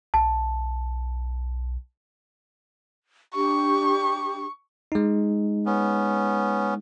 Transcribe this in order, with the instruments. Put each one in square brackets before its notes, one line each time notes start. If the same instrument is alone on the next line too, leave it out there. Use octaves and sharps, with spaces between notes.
[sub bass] B1 [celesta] A5
[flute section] D4 G4 [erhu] C#6
[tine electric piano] G#3 D#4
[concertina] B3 C#4